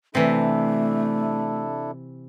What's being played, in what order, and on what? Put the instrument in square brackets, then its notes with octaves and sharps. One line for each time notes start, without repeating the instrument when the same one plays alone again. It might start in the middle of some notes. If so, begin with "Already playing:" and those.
[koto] C3 E3 [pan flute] A3 [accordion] D4 E4 A4